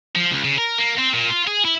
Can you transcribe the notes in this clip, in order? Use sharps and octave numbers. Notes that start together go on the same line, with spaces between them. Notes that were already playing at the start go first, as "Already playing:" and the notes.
F3
C#2
C#3
A#4
A#3
C4
A#2
F4
G#4
E4